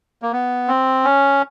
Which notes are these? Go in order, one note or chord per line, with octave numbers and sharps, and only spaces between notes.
A#3
B3
C4
C#4